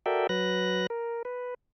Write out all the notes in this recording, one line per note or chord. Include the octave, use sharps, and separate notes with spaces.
F#4 A4 A#4 D5 E5 G5
F#3 B4 F#6 A#6
A#4
B4